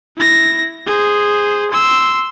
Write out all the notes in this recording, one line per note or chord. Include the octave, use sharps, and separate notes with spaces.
E4 A#6
G#4 C5
C6 E6